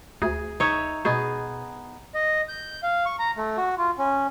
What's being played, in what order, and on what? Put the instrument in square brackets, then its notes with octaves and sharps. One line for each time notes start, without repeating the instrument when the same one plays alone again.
[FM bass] D2 [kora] G#4
[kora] D#4 C#5 E5
[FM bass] B2 [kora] B3 D#4 G#4
[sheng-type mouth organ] D#5
G6
F5
C#6
A#5
A3
F#4
F4
C#4